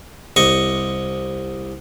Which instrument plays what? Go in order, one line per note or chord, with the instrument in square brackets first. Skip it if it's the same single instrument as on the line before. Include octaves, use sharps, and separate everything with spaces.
[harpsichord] C2 D#5 C#6